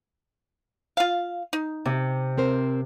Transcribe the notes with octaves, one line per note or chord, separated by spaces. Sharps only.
F4 F5
D#4
C3
C4 A#4 C5